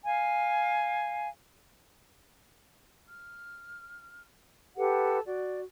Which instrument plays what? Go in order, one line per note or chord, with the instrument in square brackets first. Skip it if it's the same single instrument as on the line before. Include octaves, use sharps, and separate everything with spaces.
[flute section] F5 G#5
F6
G4 A4 B4 F#5
F#4 D5